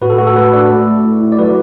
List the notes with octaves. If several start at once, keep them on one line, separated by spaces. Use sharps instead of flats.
A2 F#4 B4
A4
A3 F#4
A4
A3 F#4 B4
D4 A4 D5
A3
A3
E4
E4
D5
F#3 F#4 B4